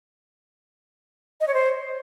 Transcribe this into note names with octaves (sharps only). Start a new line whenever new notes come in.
D#5
C#5
C5